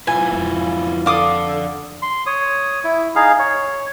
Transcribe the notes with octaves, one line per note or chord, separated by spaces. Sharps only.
E4 F4 B4 G#5
F2
D4 A4 F5 D6 D#6
C6
C#5 D#6
E4
D#4 G#4 F5
C#5